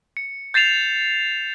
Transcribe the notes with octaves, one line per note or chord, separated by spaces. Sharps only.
C#7
G6 A6 C7 E7 F7